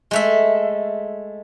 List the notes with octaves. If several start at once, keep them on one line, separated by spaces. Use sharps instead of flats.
G#3 A3 E5